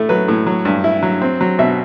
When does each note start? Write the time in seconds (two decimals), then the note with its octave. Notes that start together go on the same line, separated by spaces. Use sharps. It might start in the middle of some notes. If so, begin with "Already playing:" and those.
Already playing: A2 A3
0.09 F#3 B4
0.28 A2
0.47 F#3
0.65 G2
0.84 E4
1.03 F#3
1.22 C4
1.41 F#3
1.59 B2 E5